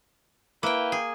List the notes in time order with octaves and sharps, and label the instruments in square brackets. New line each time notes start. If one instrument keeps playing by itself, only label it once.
[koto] A#3 G5 [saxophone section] E4 B4
[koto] G#4